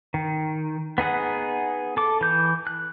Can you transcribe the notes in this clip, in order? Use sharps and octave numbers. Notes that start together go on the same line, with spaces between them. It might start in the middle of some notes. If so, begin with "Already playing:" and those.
D#3
B3 D#4 G#4 F#5
A4 D6
E3 G6
F#6